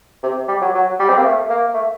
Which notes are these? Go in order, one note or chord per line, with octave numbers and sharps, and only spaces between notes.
C3
G3
F#3
F#3
G3
C4
A#3
A3
A#3
A3